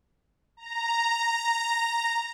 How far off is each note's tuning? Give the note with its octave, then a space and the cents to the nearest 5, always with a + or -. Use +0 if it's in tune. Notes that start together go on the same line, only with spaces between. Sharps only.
A#5 -5